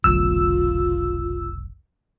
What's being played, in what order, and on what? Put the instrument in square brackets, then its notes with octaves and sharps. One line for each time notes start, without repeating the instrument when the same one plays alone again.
[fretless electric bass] F1 B1 D3 [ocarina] F4 [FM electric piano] E6